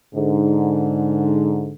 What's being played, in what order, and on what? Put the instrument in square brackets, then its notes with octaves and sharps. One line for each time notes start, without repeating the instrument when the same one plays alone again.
[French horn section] G#2 D3